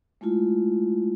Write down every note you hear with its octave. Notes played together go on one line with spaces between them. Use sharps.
G#3 A3 E4 F4